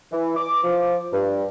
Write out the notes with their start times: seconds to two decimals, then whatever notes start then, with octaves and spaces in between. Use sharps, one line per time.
0.12 E3
0.36 D6
0.64 F3
1.13 G2